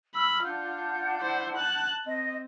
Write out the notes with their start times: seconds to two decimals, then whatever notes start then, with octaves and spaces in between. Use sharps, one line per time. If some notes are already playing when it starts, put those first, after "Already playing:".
0.14 B5 E6 F6
0.44 D4 F4 F#5 G6
1.21 E4 C5
1.56 A5 F#6
2.06 C4 D#5